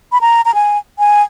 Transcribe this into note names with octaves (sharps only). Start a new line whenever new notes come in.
B5
A#5
A#5
G#5
G#5